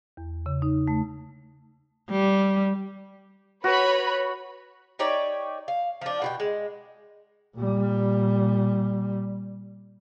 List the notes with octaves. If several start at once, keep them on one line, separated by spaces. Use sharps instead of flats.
E2
C#3
D#4
A3
G3
F#4 B4 C#5 B5
D#4 G4 C#5 D5
F5
F3 D4
B2 F#4 G4
G#3
A#2 G3